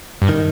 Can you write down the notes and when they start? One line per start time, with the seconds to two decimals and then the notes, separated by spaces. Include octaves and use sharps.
0.22 G2
0.29 D#3